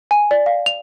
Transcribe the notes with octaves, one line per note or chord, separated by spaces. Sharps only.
G#5
D5
F5
F7